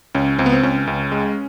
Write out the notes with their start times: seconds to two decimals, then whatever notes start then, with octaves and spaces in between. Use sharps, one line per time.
0.15 C#2 C#4
0.38 C#2 C4
0.46 B3
0.53 C4
0.63 C#2 C#4
0.87 C#2
1.12 G#3